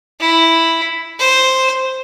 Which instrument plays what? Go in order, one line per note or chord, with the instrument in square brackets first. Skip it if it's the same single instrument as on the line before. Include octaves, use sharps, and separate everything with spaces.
[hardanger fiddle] E4
C5